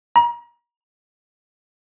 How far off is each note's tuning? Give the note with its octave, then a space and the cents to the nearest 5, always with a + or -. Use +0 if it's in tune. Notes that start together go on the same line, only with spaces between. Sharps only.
A#5 +35